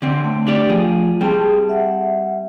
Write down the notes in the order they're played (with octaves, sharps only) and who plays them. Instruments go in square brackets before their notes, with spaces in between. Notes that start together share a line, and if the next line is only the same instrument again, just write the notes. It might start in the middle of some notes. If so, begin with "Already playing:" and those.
[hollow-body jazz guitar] D3 C4
[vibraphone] A3
[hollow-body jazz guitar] D4 G4 D5
F3 G#4
[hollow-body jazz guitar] G3 C4 [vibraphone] G#4 A5
[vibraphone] E5 F#5